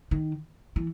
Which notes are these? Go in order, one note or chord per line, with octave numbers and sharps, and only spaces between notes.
D#3
E3